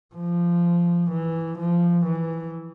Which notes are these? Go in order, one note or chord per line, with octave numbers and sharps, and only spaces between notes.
F3
E3
F3
E3